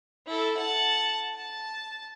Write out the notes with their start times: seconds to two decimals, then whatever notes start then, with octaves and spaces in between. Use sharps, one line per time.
0.26 E4 A4
0.57 F#5 A5
1.35 A5